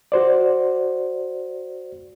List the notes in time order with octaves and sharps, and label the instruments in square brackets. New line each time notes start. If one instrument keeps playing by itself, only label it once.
[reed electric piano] F#4 C5 D5